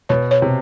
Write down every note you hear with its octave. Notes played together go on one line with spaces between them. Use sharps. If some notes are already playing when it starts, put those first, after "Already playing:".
B2 C#5
C#5
C3